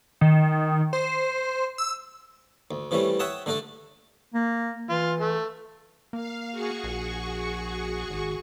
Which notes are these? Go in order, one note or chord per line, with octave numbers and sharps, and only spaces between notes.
D#3
C5
E6
D2
C3 E3 G3 A3 C#4
C#5 E5 F#5 G5 A5 D#6
D3 A3 D4 A4 D5
A#3
E3 F4
A3
A#3 F5
F#4 G#4 C#6
A#1
G#1